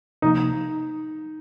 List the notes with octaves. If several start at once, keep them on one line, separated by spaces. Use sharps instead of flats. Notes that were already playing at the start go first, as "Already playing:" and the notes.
C3 F3 A#3 D#4